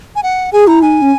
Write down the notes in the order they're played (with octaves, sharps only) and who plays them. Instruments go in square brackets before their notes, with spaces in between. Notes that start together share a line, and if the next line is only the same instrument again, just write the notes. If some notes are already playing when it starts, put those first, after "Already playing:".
[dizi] G#5
F#5
[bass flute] G#4 [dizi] G#5
[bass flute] E4 [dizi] A#5
[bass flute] D#4 [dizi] G#5
[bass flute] C#4